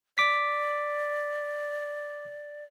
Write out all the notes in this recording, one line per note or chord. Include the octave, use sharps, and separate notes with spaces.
D5 D6 B6